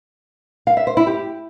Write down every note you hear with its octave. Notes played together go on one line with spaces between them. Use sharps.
F5
E5
C5
E4
G4